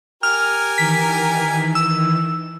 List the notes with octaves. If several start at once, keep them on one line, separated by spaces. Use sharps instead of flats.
G4 A#4 G#5 F6
D#3 E3 B6
E6